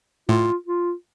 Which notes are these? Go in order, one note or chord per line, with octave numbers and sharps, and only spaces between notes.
A2 F4
F4